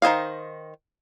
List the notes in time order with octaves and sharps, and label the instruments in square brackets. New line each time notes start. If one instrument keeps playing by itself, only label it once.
[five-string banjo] D#3 C5 D#5 F5